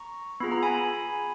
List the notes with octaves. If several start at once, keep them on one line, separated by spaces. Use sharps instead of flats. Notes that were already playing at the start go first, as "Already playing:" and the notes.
Already playing: A#5 C#6
B3 F4 G#4 B5
A#5
G#5 B5